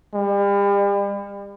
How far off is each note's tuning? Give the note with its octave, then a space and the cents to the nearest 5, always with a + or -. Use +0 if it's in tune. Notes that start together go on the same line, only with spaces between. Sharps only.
G3 +40